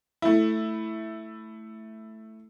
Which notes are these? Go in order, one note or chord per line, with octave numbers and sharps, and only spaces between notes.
A3 E4